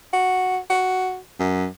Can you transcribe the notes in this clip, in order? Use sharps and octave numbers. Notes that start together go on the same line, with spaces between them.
F#4
F#4
F#2